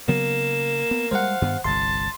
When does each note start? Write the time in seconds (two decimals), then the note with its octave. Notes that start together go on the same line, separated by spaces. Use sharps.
0.08 C#3 F#3 A#3 B3 E7
0.91 B3
1.11 G3 G#3 C5 F5 F#5
1.42 G2 D#3 B3
1.64 G1 C2 A5 C6